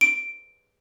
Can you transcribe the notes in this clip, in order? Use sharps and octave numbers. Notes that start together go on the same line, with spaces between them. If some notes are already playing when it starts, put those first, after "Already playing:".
D7